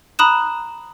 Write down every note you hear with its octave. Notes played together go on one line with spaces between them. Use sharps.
A#5 B5 D#6 F#6 E7